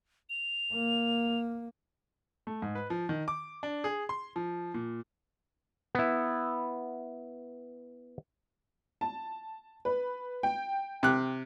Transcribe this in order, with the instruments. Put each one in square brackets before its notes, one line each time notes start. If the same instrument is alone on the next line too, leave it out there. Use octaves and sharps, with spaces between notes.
[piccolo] F7
[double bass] A#3
[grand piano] A3
G#2
B4
F3
D#3
D6
D4
G#4
C6
F3
A#2
[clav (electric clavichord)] B3 E4
[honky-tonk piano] A5
B4
G5
[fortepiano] C3 F#6